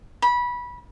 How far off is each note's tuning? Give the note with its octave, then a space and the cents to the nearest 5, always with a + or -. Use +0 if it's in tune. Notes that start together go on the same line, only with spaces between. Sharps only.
B5 -20